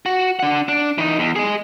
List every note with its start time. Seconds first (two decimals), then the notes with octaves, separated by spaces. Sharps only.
0.06 F#4
0.39 D4 F#5
0.69 D4
0.98 E3 D#4
1.19 E2
1.36 G#4 D#5